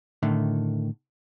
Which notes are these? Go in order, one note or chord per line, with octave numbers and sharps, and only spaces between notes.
A2 D3 D#3 A3